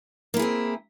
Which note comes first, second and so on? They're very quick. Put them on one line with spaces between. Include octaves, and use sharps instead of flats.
A#3 E4 G#4 C4